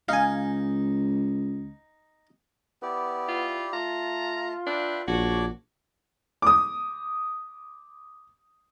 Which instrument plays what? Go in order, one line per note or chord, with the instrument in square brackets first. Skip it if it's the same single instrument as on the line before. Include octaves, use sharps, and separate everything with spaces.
[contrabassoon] C#2 [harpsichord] D#4 [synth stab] F5 G#5
[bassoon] B3 [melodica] E4 G4 D5
[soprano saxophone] F4
[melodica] A3 A5 [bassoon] F4 [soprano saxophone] A#5
[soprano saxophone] D4 [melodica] B4 E5 G5
[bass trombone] A#1 [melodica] D4 C#5 D6 [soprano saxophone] F#4
[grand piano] D6 D#6